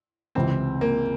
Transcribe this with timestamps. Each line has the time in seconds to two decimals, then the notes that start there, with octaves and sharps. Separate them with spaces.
0.35 C#2 C3 E3 C4
0.81 A#3